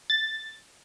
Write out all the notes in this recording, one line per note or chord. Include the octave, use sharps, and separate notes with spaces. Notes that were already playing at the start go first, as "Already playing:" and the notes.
A6